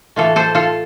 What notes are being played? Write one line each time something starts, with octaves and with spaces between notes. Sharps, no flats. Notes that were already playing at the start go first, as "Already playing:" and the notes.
A2 E3 A3 F4 A4
A4 C5
F4 A4